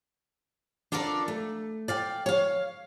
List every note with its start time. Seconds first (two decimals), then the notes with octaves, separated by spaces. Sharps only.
0.92 D4 F4 A4 A#4 D5
1.28 A3
1.88 D5 F5 G5
2.26 C#5 F5